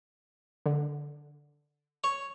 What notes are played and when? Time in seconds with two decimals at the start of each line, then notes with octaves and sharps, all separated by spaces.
0.66 D3
2.04 C#5